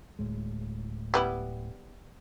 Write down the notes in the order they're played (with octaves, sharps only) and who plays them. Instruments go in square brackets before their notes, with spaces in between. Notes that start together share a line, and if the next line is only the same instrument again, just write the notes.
[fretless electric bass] D1 A2 G#3
[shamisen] G3 B3 E4